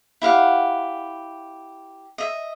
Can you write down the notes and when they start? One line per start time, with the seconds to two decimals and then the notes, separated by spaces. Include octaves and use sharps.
0.22 E4 G4 F5 F#5
2.18 D#5 E5